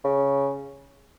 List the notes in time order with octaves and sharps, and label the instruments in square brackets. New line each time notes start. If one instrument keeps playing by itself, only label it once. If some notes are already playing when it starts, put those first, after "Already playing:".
[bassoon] C#3